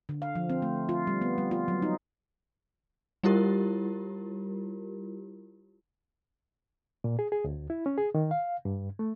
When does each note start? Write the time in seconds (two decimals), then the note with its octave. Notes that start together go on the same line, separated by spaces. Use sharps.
0.09 D3
0.22 F5
0.35 F3
0.50 C4
0.62 A3
0.89 F4
1.07 G3
1.22 B3
1.38 G3
1.51 F4
1.68 F#3
1.82 D#4
3.23 G3 E4 F4 G4 A#4
7.04 A#2
7.19 G#4
7.32 G#4
7.44 D2
7.70 E4
7.86 C#4
7.98 G#4
8.15 D#3
8.31 F5
8.65 G2
8.99 A3